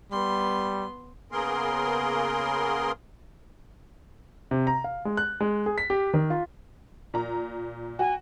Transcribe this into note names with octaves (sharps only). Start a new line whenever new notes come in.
G3 B3 C6
C#3 A#3 B3 G#4 A#4 C6
C3
A#5
F5
G#3
F#6
G#3
G#4
B6
G4
D#3
F4
A#2 A#5
F#4 G#5